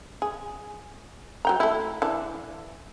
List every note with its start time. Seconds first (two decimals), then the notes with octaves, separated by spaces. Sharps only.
0.22 G#4
1.45 F#3 G5 A#5
1.60 A3 E4
2.02 E3 D4